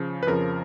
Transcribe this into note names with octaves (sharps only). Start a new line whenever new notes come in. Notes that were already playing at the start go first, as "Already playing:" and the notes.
Already playing: C#3 F3
B4
F2 C#3 F3 A#4